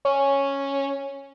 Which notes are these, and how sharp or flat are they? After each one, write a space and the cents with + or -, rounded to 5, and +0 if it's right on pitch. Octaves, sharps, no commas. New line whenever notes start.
C#4 -5